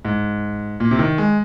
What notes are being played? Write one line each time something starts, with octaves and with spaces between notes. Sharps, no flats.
G#2
A#2
C3
D#3
G#3